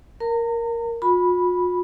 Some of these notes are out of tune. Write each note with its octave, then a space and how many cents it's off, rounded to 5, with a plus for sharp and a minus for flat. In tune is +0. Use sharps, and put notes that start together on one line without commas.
A#4 +0 A#5 -40
F4 +45 B5 -5